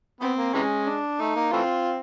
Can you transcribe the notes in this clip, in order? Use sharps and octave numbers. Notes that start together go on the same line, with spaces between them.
B3 C4
A#3
C3 E3 G#3 C#4
D4
A3 D#4
A#3
E3 A3 C4 F4